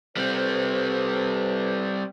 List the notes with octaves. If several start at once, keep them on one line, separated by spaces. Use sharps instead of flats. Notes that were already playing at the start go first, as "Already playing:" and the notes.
G3 C4 A4 B4 C5